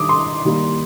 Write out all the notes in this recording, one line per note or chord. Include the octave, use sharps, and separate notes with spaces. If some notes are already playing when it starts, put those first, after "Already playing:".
Already playing: D#3 G3 D4 D6 D#6
C6
D#3 G3 A#3